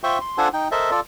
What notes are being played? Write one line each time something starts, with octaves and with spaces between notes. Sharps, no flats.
F4 C5 E5 G5 C6 C#6
C6
D4 F4 A4 C5 F#5 G#5
D#4 G5
A4 A#4 C5 D#5 E5 A5
F4 A4 D5